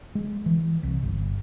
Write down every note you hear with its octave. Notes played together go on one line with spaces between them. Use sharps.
G#3
E3
C2
G1